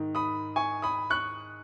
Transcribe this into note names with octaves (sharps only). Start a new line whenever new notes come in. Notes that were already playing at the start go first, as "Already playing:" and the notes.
Already playing: G#2 D#3
B5 D#6
G#5 C#6
B5 D#6
C#6 F#6